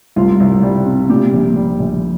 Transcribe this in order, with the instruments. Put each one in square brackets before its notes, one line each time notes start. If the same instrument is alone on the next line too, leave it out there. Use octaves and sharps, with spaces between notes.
[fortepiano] C2 F4
C2
G3
C3
A#2 G4
A#1
G3
A#1